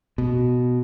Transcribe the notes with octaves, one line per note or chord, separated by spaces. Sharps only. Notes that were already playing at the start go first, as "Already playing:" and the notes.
B2